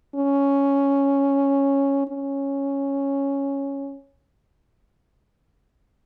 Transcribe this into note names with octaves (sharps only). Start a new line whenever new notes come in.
C#4
C#4